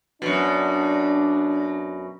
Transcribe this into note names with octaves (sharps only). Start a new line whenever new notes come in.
F#2 B2 D4